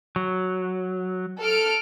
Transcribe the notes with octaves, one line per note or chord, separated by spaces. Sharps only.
F#3
A4 F6 D7